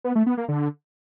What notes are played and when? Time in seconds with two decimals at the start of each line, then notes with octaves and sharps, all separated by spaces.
0.04 B3
0.15 A3
0.26 B3
0.37 A#3
0.48 D3